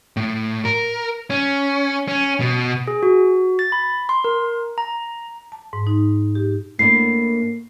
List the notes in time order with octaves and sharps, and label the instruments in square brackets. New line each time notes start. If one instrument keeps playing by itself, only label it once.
[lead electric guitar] A2
A#4
C#4
C#4
B2
[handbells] G#4
F#4
A6
B5
C6
A#4
A#5
[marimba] A5
G#2
D#4
G4
[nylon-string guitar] A2 B3 D4 [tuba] A#3 [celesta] C7